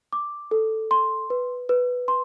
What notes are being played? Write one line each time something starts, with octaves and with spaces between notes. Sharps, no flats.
D6
A4
C6
B4
B4
C6